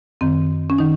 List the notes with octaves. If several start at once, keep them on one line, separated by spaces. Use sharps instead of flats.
F#2 D#3 C4
C#4
D#3 D#4